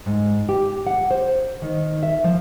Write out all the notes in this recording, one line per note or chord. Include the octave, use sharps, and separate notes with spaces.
G#2
G4
F#5
C5
D#3
E5
F3